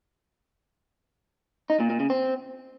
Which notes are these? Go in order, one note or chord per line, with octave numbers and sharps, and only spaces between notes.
D#4
A#2
A#2
C#3
C4